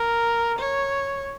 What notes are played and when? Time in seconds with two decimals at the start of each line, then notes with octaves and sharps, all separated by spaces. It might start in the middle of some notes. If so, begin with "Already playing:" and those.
Already playing: A#4
0.59 C#5